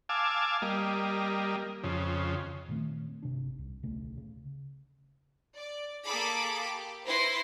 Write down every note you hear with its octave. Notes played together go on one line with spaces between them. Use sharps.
F5 G#5 A5 D6 E6
G3 A#3 D#5
F2 C#3
A#2 D#3 A3 C4
G1 C3 D4
C2
D1 B1 C#3 A3
C#3
D5
A#3 G#4 A4 B5 D6
G4
E4 B4 C5 C6 A#6